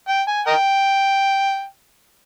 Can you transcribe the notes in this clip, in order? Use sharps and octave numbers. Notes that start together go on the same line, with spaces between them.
G5
G#5
A#4 D#5 G5